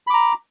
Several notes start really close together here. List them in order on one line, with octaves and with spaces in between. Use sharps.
B5 D6 A#5